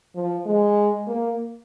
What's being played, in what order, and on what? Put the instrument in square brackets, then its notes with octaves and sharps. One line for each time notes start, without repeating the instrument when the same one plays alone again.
[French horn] F3
G#3
A#3